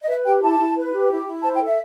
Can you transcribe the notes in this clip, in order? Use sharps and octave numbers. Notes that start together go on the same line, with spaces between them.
D#5
B4 E5
G4 G5
E4 A5
E4
B4
G4
E4
E4
C5 A5
G5
A4
E5